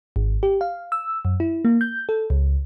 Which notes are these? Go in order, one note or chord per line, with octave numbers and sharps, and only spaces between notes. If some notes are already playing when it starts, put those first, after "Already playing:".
G#1
G4
F5
E6
F#2
E4
A#3
G6
A4
C#2